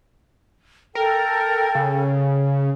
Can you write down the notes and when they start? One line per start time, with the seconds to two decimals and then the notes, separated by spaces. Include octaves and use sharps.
0.95 A4 A#4 G5
1.75 C#3